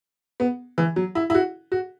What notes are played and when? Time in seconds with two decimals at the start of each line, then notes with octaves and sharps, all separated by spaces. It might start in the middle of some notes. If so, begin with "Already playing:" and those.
0.40 B3
0.78 E3
0.96 F#3
1.15 E4
1.30 E4
1.35 F#4
1.72 F#4